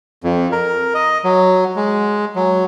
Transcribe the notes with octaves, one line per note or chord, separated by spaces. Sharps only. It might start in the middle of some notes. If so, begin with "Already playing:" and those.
F2
A#4
D#5
F#3
G#3
F#3